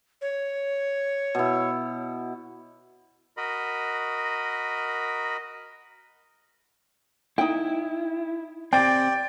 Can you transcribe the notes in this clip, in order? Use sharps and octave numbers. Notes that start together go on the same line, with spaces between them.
C#5
B2 E4
F#4 A#4 D#5 B5
D#4 E4 G5
C4 G4 D5 G5 D7